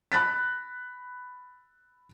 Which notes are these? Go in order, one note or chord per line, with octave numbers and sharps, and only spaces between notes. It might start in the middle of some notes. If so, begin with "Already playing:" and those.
B5 F#6 A6 B6